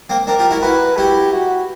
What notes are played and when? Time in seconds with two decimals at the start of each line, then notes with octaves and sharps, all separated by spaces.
0.10 A#3 C4
0.27 C4 D4 A#4
0.39 F4 G4
0.51 E4 F#4
0.63 E4 F#4 B4
0.97 E4 F#4 G4
1.32 F#4